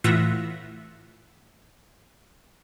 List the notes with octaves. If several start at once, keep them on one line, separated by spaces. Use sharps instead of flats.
A2 E3 F4 E5 F#5 A#6